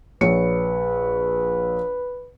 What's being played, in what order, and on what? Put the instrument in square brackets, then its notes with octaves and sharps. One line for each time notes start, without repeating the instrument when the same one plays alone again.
[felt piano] A#1 C#5 C#7 [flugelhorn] B4